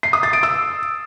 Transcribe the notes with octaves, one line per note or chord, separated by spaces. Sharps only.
C7
D#6
A6
D7
E6